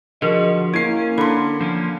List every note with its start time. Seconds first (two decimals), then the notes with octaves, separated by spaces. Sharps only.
0.22 D3 F3 F#4 G#4 A#4 D#5
0.74 A#3 C#4 E4 G#6 C7
1.18 D3 B5 C6
1.61 F3 A#3 C#4